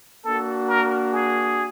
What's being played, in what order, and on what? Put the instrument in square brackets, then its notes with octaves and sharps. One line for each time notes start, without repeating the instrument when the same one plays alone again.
[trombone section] A#3 D4 F#4 [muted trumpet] A4
[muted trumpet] A#4
G#4